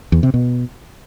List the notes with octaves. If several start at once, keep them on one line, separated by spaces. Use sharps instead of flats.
E2
C3
B2